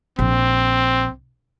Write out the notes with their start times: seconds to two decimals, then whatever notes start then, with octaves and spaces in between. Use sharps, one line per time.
0.19 A#1 C4